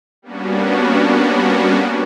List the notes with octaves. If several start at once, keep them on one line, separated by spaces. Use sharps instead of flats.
G3 A#3 B3 C#4 D4 F#4